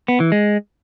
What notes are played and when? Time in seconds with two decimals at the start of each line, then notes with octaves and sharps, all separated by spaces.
0.08 B3
0.20 E3
0.32 G#3